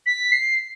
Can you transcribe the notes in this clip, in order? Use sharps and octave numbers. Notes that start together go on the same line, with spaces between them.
B6
C7